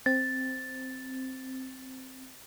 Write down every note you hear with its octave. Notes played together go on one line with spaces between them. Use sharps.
C4 A6